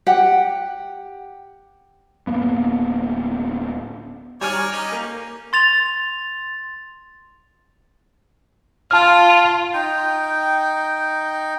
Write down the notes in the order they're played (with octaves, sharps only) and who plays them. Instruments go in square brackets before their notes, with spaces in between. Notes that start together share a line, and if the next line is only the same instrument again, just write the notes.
[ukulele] G4 F#5
[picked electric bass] D1 G2 A#3 B3
[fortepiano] G3 G#5 F6 [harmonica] C#5 D5
[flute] A#5
[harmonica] C#4 D#4
[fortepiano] A#3
[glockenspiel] C6 A6 F7
[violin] F4 [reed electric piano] A5 F6
[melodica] D#4 G5